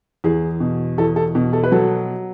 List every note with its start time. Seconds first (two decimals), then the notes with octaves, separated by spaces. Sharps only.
0.24 E2 G#4
0.60 B2
0.98 E2 A4
1.16 A4
1.35 B2
1.53 A4
1.64 B4
1.72 F#3 A4